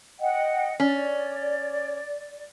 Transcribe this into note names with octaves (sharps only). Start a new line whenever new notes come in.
D#5 F#5 G5
C#4 D5